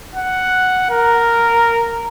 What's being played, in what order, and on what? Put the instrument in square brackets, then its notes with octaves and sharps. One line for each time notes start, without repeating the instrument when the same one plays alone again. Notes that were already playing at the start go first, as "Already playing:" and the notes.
[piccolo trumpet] F#5
A#4